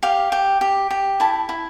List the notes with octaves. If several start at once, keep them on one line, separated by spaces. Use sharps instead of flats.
G4 F5
G4
G4
G4
E4 A5
E4